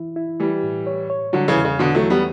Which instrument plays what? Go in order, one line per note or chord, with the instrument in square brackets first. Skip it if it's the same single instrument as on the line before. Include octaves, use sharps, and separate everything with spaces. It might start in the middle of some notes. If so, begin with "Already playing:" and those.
Already playing: [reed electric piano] E3 E4
E4
[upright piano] E3 G3 [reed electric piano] A3
[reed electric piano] A2
C#5
C#5
[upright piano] D3 F#3 [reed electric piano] G3
[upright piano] C#3 E3
[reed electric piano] E2
[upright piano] C#3
[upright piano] B2 D3 [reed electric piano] E3
[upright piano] F#3 A3
[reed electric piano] E3
[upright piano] G3 B3